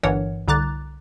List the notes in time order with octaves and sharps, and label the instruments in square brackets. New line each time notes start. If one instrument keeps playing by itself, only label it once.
[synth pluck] G1 G2 E3 A#4 C#5 F#5
C2 D3 A#5 D6 F#6 A6